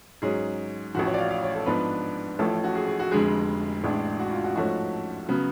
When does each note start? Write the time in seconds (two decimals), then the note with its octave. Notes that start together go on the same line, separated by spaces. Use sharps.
0.22 G#2 F#3 C#4 G#4
0.95 A1 A2 F3 F#4
1.06 C#5
1.14 D5
1.19 F5
1.31 F5
1.43 C#5
1.55 A4
1.66 G#2 F3 B3 D4 B4
2.39 A1 A2 F3 A3 C#4 A4
2.64 F#4
2.75 G#4
2.87 G#4
3.00 F#4
3.11 F1 F2 D3 G#3 G#4
3.84 A1 A2 G#3 D4
4.19 F#4
4.32 F4
4.44 F#4
4.56 G#2 F3 A3 C#4 F#4
5.29 C#3 F#3 B3